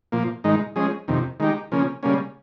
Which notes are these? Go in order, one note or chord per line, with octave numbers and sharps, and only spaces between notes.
A#2 F3 A#3
G#2 D#3 G#3 D#4
F3 G#3 C#4 G#4
F2 C3 D#3
D#3 G#3 D#4 G4
C#3 F3 A#3 C#4
C#3 G3 A#3 C#4